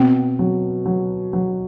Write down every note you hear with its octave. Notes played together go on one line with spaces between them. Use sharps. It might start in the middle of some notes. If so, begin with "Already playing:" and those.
Already playing: B2 C4
F#3
F#3
F#3